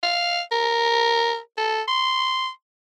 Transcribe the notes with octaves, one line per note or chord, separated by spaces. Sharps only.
F5
A#4
A4
C6